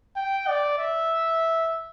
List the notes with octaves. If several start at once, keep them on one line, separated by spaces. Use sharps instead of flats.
G5
D5
E5